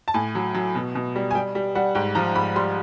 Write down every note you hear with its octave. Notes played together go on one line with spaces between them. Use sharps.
A5
A2 G#5
F#3
F#3
B2
B2
G3
G#5
G3 G5
G3
G3 F#5
G#2 G5
F3 A#5
G#2 B5
G3 C6